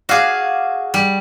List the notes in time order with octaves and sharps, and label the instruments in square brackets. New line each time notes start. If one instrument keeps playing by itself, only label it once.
[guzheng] F#4 G#4 [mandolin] D5 F5
[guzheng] G3